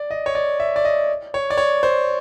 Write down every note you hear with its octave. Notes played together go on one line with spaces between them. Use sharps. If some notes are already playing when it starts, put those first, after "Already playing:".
Already playing: D5
D#5
C#5
D5
E5
D5
D#5
C#5
D5
C#5
C5